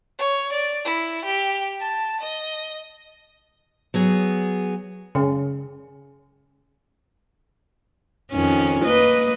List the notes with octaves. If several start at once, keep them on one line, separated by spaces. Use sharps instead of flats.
C#5
D5
E4
G4
A5
D#5
F#3 B3 G#4
C#3
F2 D#3 C#4
A#3 B4 D#5